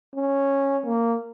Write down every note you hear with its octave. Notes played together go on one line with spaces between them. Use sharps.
C#4
A#3